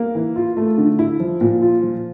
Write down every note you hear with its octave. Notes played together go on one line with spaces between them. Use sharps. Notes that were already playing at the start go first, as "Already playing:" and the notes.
Already playing: A#3
E3
F4
A3
D3
E4
F3
A#2
F4
F3